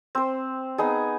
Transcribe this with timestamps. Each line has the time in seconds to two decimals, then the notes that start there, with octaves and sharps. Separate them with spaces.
0.15 C4 C5
0.78 B3 D#4 G#4